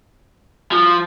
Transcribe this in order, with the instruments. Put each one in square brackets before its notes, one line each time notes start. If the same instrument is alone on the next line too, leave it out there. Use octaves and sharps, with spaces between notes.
[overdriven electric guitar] F3